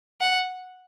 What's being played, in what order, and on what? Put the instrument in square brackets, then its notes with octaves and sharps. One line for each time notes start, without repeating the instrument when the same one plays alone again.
[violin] F#5